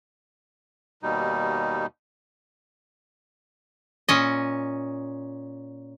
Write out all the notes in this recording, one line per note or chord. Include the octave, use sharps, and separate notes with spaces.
D#2 B2 G3 D#4
A#2 C#4 D#5